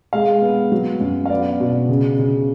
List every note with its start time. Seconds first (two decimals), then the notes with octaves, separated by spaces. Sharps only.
0.13 G#3 F5
0.42 B3
0.72 F#3
1.00 F#2
1.26 F5
1.30 B3 D5
1.60 B2
1.89 C#3
2.19 C#3